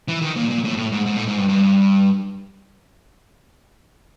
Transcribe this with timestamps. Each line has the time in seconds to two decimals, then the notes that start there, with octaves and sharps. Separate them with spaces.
0.08 E3
0.22 D#3
0.36 A#2
0.50 A#2
0.64 A2
0.77 A2
0.92 G#2
1.06 G#2
1.16 A2
1.27 G#2
1.38 G2
1.49 G2